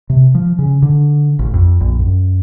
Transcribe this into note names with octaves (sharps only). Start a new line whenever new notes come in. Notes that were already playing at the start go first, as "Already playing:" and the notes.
C3
F3
C#3
D3
A1
F2
A#1
F#2